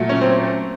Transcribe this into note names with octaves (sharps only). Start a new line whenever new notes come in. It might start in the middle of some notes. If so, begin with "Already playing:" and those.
Already playing: A#2 F#3 A3
C#4
C4